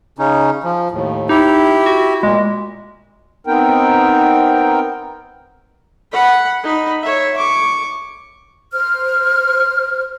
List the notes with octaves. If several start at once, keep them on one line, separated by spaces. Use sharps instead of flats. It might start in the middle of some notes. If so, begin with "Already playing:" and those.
C#3 C#4 D#4
F3
D#2 A2
D#4 E4 G4
F#4
A#2 G#3
B3 C4 D#4 A#4 G5
F#5 B5
D#4 B5
C#5 E5
C#6 D6
C5 F6